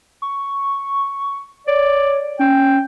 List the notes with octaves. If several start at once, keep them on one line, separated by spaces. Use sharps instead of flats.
C#6
C#5 D5
C#4 G5